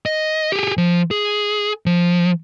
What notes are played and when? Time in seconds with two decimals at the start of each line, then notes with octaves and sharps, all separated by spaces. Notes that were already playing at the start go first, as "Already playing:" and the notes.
0.06 D#5
0.52 G4 G#4
0.78 F3
1.11 G#4
1.86 F3